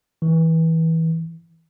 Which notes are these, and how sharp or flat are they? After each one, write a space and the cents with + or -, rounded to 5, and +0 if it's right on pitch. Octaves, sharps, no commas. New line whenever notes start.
E3 -25